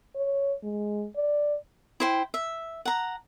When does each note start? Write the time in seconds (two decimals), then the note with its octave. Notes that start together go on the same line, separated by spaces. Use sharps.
0.16 C#5
0.63 G#3
1.16 D5
2.00 E4 C5 G5
2.34 E5
2.85 F#5 A#5